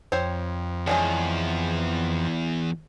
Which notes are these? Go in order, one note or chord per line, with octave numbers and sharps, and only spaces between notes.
F2 C4 C5 C#5
E2 G#3 C#4 D4